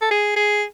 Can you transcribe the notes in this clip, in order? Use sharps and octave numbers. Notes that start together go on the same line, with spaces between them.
A4
G#4
G#4